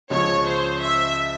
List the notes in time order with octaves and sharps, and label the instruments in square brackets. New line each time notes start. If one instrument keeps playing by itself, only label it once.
[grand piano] C#2 C#3 F3 [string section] C#5
[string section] C5
E5